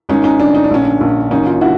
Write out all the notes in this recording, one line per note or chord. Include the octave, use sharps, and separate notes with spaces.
G#1 C#4 D#4
C#4 D#4
D3 D4
D#4
D4
A#1 C#4
D4
A#1
F#1 C#4 D#4
D#4 F4
D3 E4 F#4